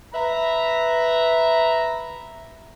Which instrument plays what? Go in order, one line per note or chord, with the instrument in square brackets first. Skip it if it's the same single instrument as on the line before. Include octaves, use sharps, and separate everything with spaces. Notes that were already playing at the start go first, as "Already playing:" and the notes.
[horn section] B4 E5 A#5